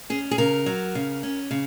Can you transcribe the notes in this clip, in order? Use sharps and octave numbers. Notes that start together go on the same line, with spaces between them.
C#4 G#4
G#4
C#3 A#4
F#3
C#3
C#4
C#3